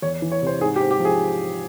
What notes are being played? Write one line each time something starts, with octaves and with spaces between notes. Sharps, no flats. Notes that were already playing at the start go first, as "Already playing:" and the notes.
E2 C#5
E3
C#5
C3 C5
G#2 G#4
G4
C4
G4
F3
G#4